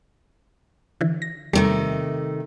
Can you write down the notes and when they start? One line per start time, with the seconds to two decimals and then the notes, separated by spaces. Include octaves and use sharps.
1.01 D3 E3
1.22 A#6
1.53 E2 C3 D#3 G3 A3